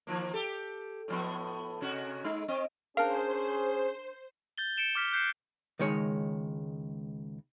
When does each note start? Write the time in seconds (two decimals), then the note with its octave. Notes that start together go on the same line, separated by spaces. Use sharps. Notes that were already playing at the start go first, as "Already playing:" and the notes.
0.07 D#3 F3 A#3
0.33 G4 A4
1.08 A2 F3 B3
1.82 C3 C#4 F#4
2.24 G#3 D#4
2.48 C4 D#5
2.97 C#4 D4 G#4 A#4 C5 F5
4.58 G6 A6 G7
4.77 C#7 D7 E7 G7
4.95 D6 F6 B6 G7
5.13 F#6 G6 C7 C#7 E7
5.79 C#2 D#3 G#3 C#5